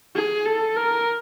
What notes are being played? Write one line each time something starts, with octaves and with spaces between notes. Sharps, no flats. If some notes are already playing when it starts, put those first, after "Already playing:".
G#4
A4
A#4